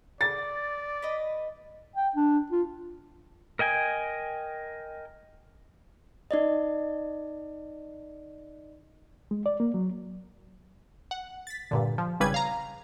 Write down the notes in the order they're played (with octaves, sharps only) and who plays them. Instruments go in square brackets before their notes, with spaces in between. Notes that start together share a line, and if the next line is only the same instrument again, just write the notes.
[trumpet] D5 [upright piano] A6
[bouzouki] B4 D#5
[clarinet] G5
D4
F4
[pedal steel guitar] A#4 D#5 G5 G#5
[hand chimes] D#4 D5 D#5
[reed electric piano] G#3
D5
A#3
F#3
[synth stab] F#5
A6 B6
G2 A#2 D3
F3
G#1 C#3 G3 B4 G#6
F5 A#5